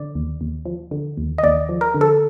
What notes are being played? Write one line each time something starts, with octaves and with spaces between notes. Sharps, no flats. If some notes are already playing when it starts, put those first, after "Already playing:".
Already playing: D3 D5
D#2
D#2
F3
D3
D#2
D#5
D#2 D5
F3
A#4
D3
A4